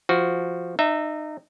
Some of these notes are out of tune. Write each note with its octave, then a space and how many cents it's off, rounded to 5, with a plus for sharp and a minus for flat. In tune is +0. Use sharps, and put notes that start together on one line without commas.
F3 -10 F#4 -5
D#4 -30 E5 +0